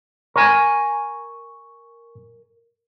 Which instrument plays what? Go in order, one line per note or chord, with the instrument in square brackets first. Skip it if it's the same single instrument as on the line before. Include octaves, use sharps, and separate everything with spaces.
[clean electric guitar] A#4 G#5 [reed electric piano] C#6